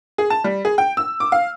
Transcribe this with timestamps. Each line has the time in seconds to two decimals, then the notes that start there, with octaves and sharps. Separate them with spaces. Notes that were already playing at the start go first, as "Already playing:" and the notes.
0.18 G#4
0.30 A5
0.44 G3
0.65 G#4
0.78 G5
0.97 E6
1.20 D6
1.32 F5